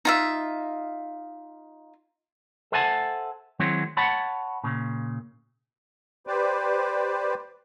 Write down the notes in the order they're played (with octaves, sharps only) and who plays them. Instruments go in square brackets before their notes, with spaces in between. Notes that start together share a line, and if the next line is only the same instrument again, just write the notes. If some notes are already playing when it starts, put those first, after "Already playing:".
[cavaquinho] D#4 F4 E5
[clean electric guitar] A4 C5 E5 F#5 G#5 A5
D#3 F#3 G#3 C4 E4 C#5
C#5 F#5 A5 B5
A#2 C#3
[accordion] G4 B4 C5 D5